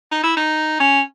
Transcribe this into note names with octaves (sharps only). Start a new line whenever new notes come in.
D#4
E4
D#4
C#4